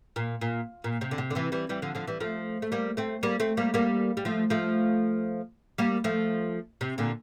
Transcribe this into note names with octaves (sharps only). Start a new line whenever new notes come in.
A#2
A#2
A#2
C3
D3
C3
D3
C3 E3
E3 G3
E3 G3
D3 F3
D3 F3
E3 G3
F3 A3
A3
G3 A#3
A3 C4
G3 A#3
A3 C4
G3 A#3
G3 A#3
G3
F3 A3
F3 A3
G3 A#3
F3 A3
C3
A#2 D3